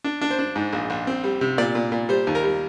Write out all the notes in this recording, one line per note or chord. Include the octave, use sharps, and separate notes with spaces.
D4
D4
C5
D4
G#2
A#1
A#1
C4
G3
C3
A#2 D5
A#2
A#2
G3 C5
D#2
A#4
G3